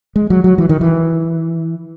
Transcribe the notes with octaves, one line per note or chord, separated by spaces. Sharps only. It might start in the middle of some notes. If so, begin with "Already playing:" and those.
G#3
F#3
F#3
E3
D#3
E3